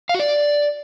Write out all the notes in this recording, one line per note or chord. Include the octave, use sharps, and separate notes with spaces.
F5
F#4
D5